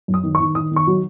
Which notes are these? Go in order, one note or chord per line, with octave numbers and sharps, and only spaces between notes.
F#2
D#6
D#3
C#6
D#3
D#3 D#6
D#3
C#6
F#3